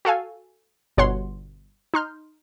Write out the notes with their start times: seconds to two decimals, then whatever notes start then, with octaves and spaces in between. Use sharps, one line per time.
0.05 F#4 A4 F5 G#5
0.97 G1 B2 C#5 F#5 C6
1.94 D#4 C6 F6 G6